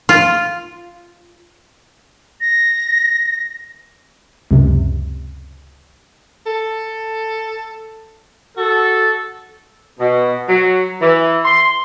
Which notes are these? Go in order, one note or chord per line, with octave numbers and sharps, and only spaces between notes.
F4
A#6
C#2 F#2 C3
A4
F#4 A4
B2
F#3
E3
C6